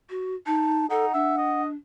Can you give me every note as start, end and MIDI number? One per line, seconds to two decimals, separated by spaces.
0.10 0.35 66
0.47 0.85 63
0.47 0.86 81
0.90 1.10 63
0.90 1.06 69
0.90 1.62 78
1.14 1.75 62
1.14 1.36 76
1.38 1.66 75